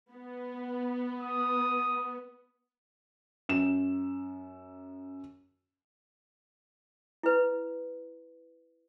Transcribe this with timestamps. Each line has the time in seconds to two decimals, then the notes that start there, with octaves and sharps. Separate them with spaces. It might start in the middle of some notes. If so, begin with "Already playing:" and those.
0.12 B3
1.21 D#6
3.49 F#2 E7
7.23 E4 B4